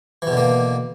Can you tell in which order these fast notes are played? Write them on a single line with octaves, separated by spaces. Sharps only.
E3 B2 D3 A#3